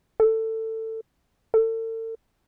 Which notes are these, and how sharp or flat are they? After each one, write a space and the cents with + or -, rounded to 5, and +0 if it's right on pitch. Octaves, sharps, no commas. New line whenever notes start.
A4 +20
A4 +40